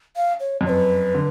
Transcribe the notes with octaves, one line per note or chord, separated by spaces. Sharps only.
F5
C#5
F2
F#2 B4 C#5
D3